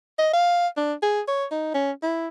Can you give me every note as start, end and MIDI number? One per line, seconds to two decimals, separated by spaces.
0.19 0.31 75
0.33 0.67 77
0.77 0.93 62
1.03 1.21 68
1.28 1.45 73
1.51 1.74 63
1.74 1.92 61
2.03 2.28 64